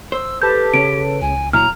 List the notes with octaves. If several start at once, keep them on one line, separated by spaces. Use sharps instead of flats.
C5 E6
G4 A4 B4 A5 G6
C#3 C#4 D7
C#2 G#5
A#2 F#3 E4 A#5 F6